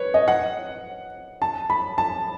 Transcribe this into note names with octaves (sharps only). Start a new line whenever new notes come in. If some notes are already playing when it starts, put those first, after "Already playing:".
Already playing: B4 C#5
D#5
F#5
A5
B5
A5